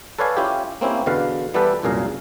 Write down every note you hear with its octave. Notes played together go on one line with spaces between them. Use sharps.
A4 B4 C#5 D5 F5 G#5
C#4 E4 F4 G4
A#3 C4 C#4 E4 G4
E2 B2 D3 B4 F5
E3 G3 B3 G4 A4 B4
C2 F#2 A#2 G#4 F5 A#5